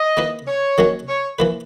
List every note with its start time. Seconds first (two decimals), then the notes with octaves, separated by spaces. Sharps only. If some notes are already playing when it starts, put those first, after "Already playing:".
Already playing: D#5
0.17 D#3 A#3 E4 B4
0.47 C#5
0.78 D#3 F#3 A#3 C#4 F#4
1.08 C#5
1.39 E3 A#3 E4 B4